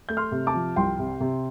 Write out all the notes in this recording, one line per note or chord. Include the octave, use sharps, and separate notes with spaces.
A3 G6
C6 F6
C3
A5 D6
F3
C2 G5 C6
C3
C3